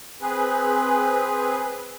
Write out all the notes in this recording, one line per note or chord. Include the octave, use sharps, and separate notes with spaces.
C4 G#4 B4